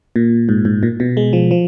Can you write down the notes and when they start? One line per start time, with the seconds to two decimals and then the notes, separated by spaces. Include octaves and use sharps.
0.16 A#2
0.49 G#2
0.65 G#2
0.83 A#2
1.00 B2
1.17 G#3
1.33 F3
1.51 F3